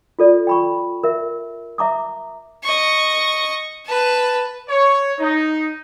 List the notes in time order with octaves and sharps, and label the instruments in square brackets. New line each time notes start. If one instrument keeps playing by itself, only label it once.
[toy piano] F4 A4 D5
G5 B5 C#6
A#4 E5
E5 A#5 D6 D#6
[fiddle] D#5 C#6
B4 A5
[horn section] C#5
D#4